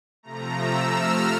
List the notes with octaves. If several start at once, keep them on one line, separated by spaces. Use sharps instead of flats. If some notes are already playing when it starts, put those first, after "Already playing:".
C3 F3 A3 A#5
E6
F6